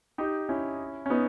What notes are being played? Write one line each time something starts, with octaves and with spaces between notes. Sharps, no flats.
D#4 G4
C#4 E4
C#4
B3 D#4